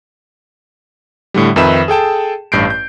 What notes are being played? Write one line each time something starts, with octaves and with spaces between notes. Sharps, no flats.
A2 D3 G3
F2 D#3 D#4 B4 E5 E7
G#4 A4 G5 A5
A1 G2 G6 C7 D7
G6